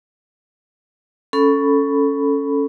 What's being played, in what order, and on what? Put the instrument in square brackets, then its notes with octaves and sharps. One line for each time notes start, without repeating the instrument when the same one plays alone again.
[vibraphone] C#4 A4 B5